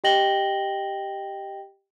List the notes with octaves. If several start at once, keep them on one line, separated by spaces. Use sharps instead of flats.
G4 D#5 G5 A#6 F#7 G7